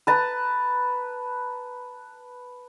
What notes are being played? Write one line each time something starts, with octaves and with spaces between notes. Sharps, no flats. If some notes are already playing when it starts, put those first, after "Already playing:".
B4 A5 A#5